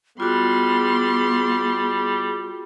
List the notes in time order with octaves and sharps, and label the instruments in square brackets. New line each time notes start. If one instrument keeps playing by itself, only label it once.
[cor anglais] G3 [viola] B3 C6 [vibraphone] F4 F#4 [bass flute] G#4